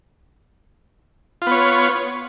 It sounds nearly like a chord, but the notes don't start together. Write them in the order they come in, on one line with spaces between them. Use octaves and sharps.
F4 B3 C#5